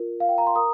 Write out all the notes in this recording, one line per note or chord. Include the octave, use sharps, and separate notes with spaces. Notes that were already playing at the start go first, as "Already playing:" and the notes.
Already playing: F4 A#4
F5
G5
A#5
C6
A#4 A#5 D#6